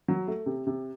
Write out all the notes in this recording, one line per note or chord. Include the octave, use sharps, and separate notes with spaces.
F#3
A3
C3
C3